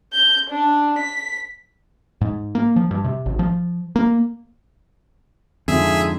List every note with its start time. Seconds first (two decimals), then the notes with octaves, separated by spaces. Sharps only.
0.13 G6
0.51 D4
0.99 B6
2.21 G#2
2.55 A#3
2.76 F3
2.91 G2
3.04 C3
3.26 G#1
3.39 F3
3.96 A#3
5.68 F2 G#2 D3 F3 G#4 E5